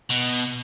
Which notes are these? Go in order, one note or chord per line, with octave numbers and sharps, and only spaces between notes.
B2